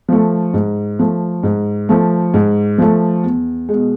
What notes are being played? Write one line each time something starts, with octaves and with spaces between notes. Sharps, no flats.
F3 A3
G#2
F3 A3
G#2
F3 A3
G#2
F3 A3
E2
B2 G#3